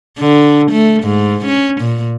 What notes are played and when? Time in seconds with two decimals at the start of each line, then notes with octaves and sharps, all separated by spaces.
0.19 D3
0.72 A3
1.03 G#2
1.46 C#4
1.81 A#2